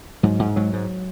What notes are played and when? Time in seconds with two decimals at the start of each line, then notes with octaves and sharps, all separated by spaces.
0.23 G#2 F#3
0.39 G#2
0.56 G#2 F#3
0.73 G#2